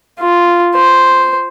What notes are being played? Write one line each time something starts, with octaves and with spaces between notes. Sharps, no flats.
F4
C5